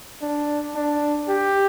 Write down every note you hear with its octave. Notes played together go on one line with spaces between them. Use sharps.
D4
D4
G4